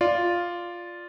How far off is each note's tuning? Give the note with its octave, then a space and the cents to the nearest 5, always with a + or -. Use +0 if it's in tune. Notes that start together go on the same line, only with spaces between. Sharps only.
F4 +0 D5 +0